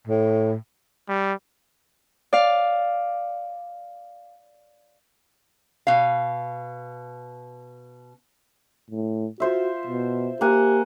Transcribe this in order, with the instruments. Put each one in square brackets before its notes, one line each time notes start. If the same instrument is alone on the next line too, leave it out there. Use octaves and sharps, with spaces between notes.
[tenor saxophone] A2
[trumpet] G3
[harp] D5 F5
[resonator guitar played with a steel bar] B2 F5
[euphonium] A2
[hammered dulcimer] F4 C5 E5 [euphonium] F#4
[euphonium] B2
[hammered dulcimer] A#3 F#5 G#5 [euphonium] G4